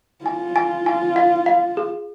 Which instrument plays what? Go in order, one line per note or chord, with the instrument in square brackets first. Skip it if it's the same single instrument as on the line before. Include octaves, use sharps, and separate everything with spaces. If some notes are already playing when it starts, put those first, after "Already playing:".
[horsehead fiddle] F4 [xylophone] G#5
[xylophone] G#5
G#5
F5
F5
G#4